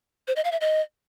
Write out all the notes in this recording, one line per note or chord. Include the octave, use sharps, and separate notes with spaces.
C5
D#5
F5
E5
D#5